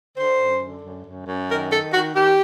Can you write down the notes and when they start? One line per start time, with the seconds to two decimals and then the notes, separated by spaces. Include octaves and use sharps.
0.17 D3 C5
0.39 F#2
0.61 D3
0.83 F#2
1.05 F#2
1.27 F#2
1.49 D#3 A#4
1.71 D#3 A4
1.92 D#3 F#4
2.15 D#3 G4